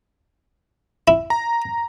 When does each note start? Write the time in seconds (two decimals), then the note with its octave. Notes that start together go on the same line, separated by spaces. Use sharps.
1.08 E4
1.30 A#5